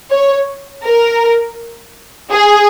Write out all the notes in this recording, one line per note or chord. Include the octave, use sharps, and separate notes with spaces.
C#5
A#4
G#4